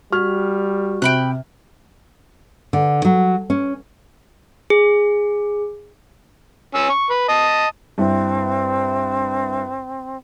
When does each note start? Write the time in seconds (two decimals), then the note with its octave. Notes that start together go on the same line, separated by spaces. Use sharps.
0.12 G3 F#4 F6
1.02 C3 G5 B5 F#6
2.73 D3
3.05 F#3
3.50 C#4
4.70 G#4
6.75 C#4 E6
6.89 C#6
7.10 B4
7.29 D#5 A5
7.98 G2 C4 E4 E5